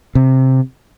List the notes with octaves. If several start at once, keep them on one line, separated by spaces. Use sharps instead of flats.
C3